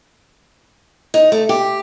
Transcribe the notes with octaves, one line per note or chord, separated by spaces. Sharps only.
D#4
A3
G4